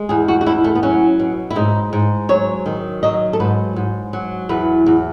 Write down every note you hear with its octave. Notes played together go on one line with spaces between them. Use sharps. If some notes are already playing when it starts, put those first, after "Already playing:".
Already playing: G#3
E2 G#4
F#4
F#4
E2 E4
A3
B3
F#3 C#4
B2
E4
G#2 D#4
G#2
F#3 C#5
D#3
F#3 D#5
A4
G#2 B4
G#2
F#3
E2 B4
E2